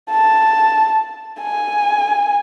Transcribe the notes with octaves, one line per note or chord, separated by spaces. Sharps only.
A5
G#5